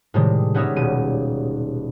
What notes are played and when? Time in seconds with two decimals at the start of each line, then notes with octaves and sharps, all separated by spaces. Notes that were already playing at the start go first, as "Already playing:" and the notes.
0.14 A2 C3 D#3 G3 G#3
0.54 G3 B3 C#4 D#4 G#4 E5
0.76 D#1 B2 D#7